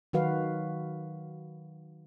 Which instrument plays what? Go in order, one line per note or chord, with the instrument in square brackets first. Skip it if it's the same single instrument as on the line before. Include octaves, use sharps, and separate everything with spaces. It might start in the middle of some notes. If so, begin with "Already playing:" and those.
[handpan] D#3 F#3 F#4 B4 F5